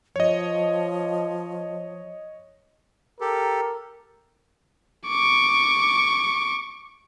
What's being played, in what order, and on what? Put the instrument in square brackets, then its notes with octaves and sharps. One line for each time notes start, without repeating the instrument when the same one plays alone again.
[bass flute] F3 [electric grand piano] C#5 D#5
[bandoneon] G4 A4 [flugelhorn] A#4
[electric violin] C#6 D6